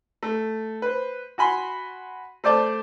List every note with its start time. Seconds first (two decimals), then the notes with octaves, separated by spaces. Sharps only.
0.23 A3
0.82 B4 C5
1.38 F#4 G#5 B5 C6
2.44 A3 C5 D5 A5 D6